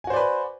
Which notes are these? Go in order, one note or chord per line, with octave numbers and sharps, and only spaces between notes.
F#4 B4 C5 D5 G#5